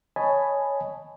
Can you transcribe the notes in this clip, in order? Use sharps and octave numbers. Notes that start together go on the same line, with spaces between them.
C#5 D#5 G#5 A5 B5